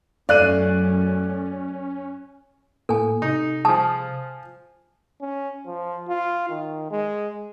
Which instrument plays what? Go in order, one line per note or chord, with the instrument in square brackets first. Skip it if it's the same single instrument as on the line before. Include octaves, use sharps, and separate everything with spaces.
[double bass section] F#2 [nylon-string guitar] A3 F5 [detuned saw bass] C#4 [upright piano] D5 F#6 D#7
[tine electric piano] A2 A#3 [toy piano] A4 G#5
[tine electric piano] C3 [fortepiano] D#4
[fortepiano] F3 G#4 [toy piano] A5 D#6
[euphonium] C#4
F3
F4
D#3
G#3